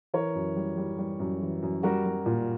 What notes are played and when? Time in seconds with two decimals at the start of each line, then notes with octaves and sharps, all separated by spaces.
0.14 E3 A#4 C#5
0.35 F#2
0.56 G3
0.77 G3
0.98 G3
1.19 F#2
1.42 E3
1.62 F#2
1.83 G3 F#4 A#4
2.05 G3
2.26 A#2